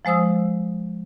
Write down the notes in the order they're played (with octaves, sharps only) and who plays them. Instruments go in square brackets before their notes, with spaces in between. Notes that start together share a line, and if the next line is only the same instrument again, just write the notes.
[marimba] F3 G#3 C5 D#6 E6